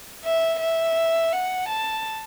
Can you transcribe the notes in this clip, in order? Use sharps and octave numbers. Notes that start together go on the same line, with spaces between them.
E5
E5
F#5
A5